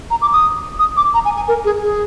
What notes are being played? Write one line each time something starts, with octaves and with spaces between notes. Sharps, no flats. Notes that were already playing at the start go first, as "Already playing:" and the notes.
A#5
D6
D#6
D#6
D6
A#5
G#5
G#5
A#4
G#4
G#4